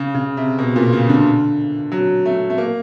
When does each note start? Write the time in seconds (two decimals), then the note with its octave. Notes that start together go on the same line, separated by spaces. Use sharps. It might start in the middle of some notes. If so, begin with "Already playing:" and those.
Already playing: C#3
0.15 C#3
0.37 C3
0.58 B2
0.76 A#2
0.93 C#3
1.09 D3
1.92 F#3
2.25 A3
2.50 A3
2.58 A#3